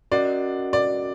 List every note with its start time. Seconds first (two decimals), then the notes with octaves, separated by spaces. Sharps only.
0.12 C#4 F#4 A#4 D5 D#5 F#5
0.73 D5